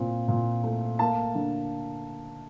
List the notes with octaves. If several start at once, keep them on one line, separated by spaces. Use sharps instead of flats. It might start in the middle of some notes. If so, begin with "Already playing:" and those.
Already playing: A#2 C4
A#2
A3
A#3 A5
D3